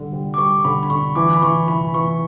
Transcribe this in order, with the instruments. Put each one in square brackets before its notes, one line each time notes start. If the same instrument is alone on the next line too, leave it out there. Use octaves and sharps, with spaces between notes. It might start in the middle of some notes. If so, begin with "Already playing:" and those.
Already playing: [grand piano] D3 G3
G3
[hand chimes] D6
[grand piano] G3 [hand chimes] C#6
[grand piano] D3 [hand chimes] B5
[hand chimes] B5
[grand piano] D3 [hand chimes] C#6
[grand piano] E3 [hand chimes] D6
[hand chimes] B5
[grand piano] E3 [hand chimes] C#6
[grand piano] E3 [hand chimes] B5
[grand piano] E3 [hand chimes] C#6